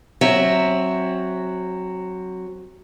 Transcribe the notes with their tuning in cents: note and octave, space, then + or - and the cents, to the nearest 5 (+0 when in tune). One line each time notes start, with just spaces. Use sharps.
F#3 +0 C4 +25 E5 -5